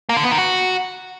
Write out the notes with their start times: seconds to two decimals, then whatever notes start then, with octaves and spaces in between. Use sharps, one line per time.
0.09 A#3
0.17 D3
0.24 B3
0.31 D#3
0.38 F#4